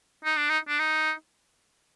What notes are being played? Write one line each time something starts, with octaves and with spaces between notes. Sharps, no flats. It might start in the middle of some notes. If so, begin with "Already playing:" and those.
D#4
D4
D#4
D4
D#4